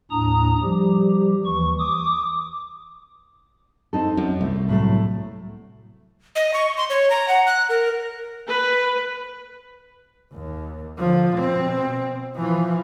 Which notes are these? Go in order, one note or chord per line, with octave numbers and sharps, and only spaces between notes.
D#2 A2 D4 A#5 D#6
F3 G3 G4
D#2 E3 C#6
D6 D#6
C4 D#4 A4
F#2
C2 A3
A2 F#3 A3
D#5
C#6
C6
C#5
A#5
F#5
F#6
A#4
B4
D#2
D3 F3
B2 C4
E3 F3